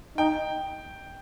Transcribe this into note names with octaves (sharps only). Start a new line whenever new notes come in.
D#4 G5